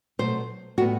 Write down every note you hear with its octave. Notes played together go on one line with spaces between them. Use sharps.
B2 F#3 A3 C5
A2 G3 B3 F#4